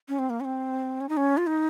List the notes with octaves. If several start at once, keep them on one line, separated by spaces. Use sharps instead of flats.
C#4
C4
A#3
C#4
C4
C#4
D#4
C#4
F4
D#4